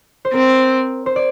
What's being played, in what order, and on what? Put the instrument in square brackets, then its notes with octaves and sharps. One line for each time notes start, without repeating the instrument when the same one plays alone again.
[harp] C5
[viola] C4 [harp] A#4
[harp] C5
D5